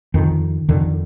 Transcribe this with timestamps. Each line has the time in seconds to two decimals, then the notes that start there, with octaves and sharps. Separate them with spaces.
0.14 F2 D3 D#3
0.69 F2 D3 D#3